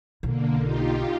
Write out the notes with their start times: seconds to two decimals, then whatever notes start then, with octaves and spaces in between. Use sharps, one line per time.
0.23 B1 B2 D3 A#3
0.61 D#4 F4 G4